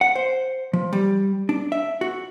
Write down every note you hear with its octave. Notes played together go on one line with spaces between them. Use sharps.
F#5
C5
F3
G3
D4
E5
F#4